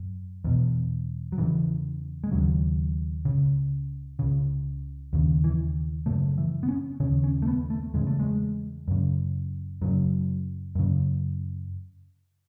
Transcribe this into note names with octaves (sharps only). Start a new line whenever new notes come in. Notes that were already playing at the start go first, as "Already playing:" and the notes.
Already playing: F#2
E2 B2
F#3
E2 C#3 E3
G#3
D#2 C#3 F#3
C#2 C#3
C#2 C#3
D#2 C#3
E3
F#2 C#3 A3
E3
B3
C#4
D#2 C#3 C#4
C#4
A3
B3
A3
E2 C#3 G#3
A3
G#3
F#2 C#3
F#2 C#3 F#3
F#2 C#3